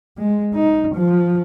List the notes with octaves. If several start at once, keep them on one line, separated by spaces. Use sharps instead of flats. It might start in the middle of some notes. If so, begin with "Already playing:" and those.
G#3
D#4
F3